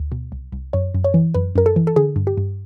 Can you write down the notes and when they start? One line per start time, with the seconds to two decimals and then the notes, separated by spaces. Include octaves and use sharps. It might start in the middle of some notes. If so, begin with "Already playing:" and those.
Already playing: D2
0.12 B2
0.32 C2
0.52 C2
0.73 F#2 C#5
0.94 F#2
1.04 C#5
1.14 E3
1.34 F#2 B4
1.55 F#2 A#4
1.66 A4
1.76 E3
1.87 A4
1.96 D3 G#4
2.16 G2
2.27 G4
2.37 G2